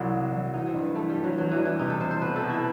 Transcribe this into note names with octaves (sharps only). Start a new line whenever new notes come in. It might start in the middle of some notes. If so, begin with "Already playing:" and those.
Already playing: C2 F#3 E4
C2
F#3
E3 D#4
C4
G2
B3
E3 A3
G3
G2
F#3
E2 F#3
E3
G3
E3
C3 D#4
A4
C3 C5
C5
B2 B4
A4
B2
E4